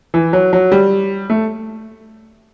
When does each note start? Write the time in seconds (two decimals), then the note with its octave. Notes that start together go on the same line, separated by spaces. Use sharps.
0.14 E3
0.33 F#3
0.53 F#3
0.72 G3
1.30 A3